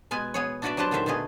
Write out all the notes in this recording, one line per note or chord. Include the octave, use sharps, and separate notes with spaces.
B2 G#3 B3 B4 G#5
B3 G#4 C#5
D4 E4 F#4 B4 D5 E5
F#3 D4 B4 C5 A5
A#2 D3 D#3 C5 E5 F5
B2 D3 A3 B3 G#4